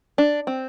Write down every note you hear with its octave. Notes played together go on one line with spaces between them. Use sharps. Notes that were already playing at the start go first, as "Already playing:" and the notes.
D4
C4